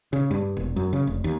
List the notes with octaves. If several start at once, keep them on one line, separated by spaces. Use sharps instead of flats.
C#3
G2
E1
F#2
C#3
F1
D#2